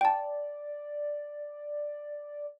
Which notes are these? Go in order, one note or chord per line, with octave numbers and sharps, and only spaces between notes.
D5 G5 A5